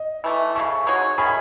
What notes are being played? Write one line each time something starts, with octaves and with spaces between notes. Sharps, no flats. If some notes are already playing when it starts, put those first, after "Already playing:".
Already playing: D#5
E3 A3 D#4
C#3 F#3 A3 C#6
G#3 D#4 F#4 C#5
D#3 A3 C#4 G#4 B5